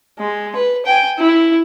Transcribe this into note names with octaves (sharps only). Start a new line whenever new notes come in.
G#3
B4
G5 G#5
E4